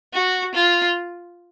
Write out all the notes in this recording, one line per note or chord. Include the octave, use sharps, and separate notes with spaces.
F#4
F4